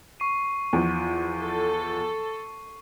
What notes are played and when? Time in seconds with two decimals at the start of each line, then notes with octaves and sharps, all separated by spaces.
0.20 C#6 C7 D#7
0.73 E2 F3
1.41 A4